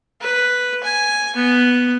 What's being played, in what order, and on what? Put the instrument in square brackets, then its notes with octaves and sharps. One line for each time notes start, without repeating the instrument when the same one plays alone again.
[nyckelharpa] B4
G#5
B3